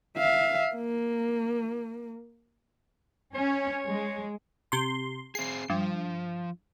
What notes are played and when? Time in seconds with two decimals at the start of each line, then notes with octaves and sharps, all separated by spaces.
0.18 E5 F5
0.75 A#3
3.35 C#4 C#5
3.87 G#3
4.72 C3 C6
5.35 C4 G#4 C7
5.70 G2 F3